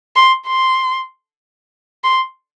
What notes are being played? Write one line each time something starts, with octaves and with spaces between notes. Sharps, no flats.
C6
C6
C6